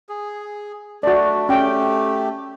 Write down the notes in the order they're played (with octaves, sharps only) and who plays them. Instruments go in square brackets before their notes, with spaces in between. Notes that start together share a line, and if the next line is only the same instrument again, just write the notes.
[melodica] G#4
[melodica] A3 D4 [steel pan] F#4 D5
[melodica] A3 G4 [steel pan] C#4 G5